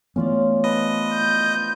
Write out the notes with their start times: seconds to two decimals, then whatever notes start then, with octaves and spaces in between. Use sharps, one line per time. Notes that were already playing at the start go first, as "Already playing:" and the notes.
0.16 E3 A3 B3 C#4 F4 D5
0.64 B4 C5 D#5 A5
1.15 G6